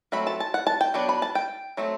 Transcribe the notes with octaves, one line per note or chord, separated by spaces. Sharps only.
F#3 A3 C4 B5
A5
A5
F#5
A5
G5
F#3 B3 D4
B5
A5
G5
F#3 A3 C4